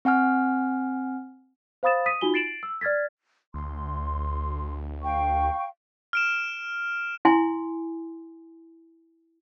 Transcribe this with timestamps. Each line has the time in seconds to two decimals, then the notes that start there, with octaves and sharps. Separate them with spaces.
0.05 C4 F#5 G#5 F6
1.83 C5 F5 B5 D#6 A6 E7
2.06 D#6 B6 D#7
2.21 D#4 F4 F#4 G#5 G7
2.34 A6 C7 D7 E7 F#7
2.63 E6
2.81 D5 F6 G#6 A6 B6
3.54 D2 C6
5.03 F5 G5 C#6
6.13 F6 D7 E7
7.25 E4 G#5 C6